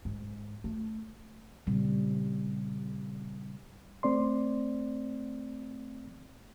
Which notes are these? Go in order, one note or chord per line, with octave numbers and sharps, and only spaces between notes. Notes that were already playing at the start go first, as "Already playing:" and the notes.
G#2
A3
A#2 C#3 G3 C4
A3 C4 D5 C6